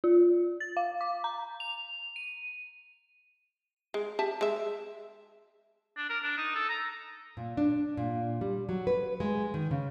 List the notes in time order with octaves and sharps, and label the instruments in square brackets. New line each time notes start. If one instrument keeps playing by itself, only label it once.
[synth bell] F4
A6
F5
D6
A#5
F7
D#7
[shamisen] G#3
G4 E5 A5
G#3 E5
[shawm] D4
A#4
D4
D#4
A4
A#5
[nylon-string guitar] A#2
D4
A#2
G3
F#3
B4
G#3
D#3
C#3